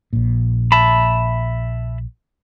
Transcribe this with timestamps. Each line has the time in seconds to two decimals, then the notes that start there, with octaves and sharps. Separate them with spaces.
0.13 A#1 A#2
0.72 E5 A5 B5